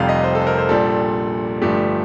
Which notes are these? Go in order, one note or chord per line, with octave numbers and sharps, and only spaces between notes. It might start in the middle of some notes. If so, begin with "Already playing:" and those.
Already playing: F1 F2 C3 G3 F5
D#5
C5
A4
C5
A#4
C5
A#1 A#2 G3 A4
G1 G2 F3 A3 G4